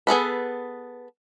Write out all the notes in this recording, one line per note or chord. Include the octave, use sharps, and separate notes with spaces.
B3 G#4 A4 B4